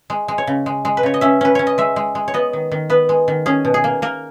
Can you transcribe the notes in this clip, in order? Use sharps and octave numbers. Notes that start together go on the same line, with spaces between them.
G#3
G#3
C#5
C#3
G#3
G#3
B4
C#3 C#5
D#5
C#4 E5
C#4 B4
C#4 C#5
D#5
G#3 E5
G#3
G#3
C#5
B3 D#5
D#3
D#3
B3 B4
G#3
D#3
C#4 G#4
B2
G#4
A#3
A#3 A#4